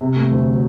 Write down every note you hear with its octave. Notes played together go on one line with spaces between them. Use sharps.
C3
A3
D2
F#3